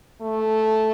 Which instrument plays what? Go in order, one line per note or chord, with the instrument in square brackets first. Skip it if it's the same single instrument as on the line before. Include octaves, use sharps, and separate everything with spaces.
[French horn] A3